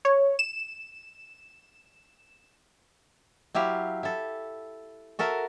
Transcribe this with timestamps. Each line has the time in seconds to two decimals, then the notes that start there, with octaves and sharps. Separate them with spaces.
0.05 C#5
0.39 E7
3.55 F#3 E4 G4 F5
4.03 E4 A4
5.19 F#4 A4 A#4 E5